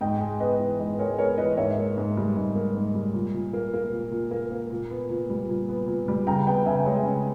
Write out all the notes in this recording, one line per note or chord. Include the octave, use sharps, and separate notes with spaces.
G#2 D#5 G5
G#3
B3 B4 D#5
E3
G#2 B4 D#5
G#3 A#4 C#5
B3 A#4 C#5
E3 B4 D#5
G#2 C#5 E5
A#3
G#2
G3
G#2
A#3
G#2
G3
A#2
A#2
A#3
A#3
A#2
A#2
A#3
A#3
A#2
B3
A#2
G3
A#2
B3
A#2
G3
C#3 G5 A#5
B3 G5 A#5
C#3 E5 G#5
G#3 C#5 E5
C#3